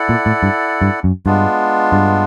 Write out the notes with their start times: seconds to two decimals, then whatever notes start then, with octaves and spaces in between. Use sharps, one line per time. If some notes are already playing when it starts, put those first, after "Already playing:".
Already playing: E4 A4 D5 F#5
0.09 A#2
0.26 A2
0.43 G2
0.82 G2
1.04 F#2
1.26 G2 G#3 B3 D4 F4
1.92 G2